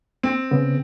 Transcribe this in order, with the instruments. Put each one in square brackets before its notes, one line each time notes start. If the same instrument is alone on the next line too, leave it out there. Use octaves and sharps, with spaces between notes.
[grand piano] C4
[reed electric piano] C#3 B3